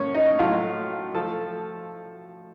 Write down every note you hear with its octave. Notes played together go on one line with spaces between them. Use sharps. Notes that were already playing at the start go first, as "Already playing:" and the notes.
Already playing: A2 A3 A#3 C#4 C#5
D#4 D#5
A2 F#3 A3 F4 F5
F3 A3 A4 A5